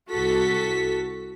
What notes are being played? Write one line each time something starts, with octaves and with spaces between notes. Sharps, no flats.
C2 F#4 A4 B6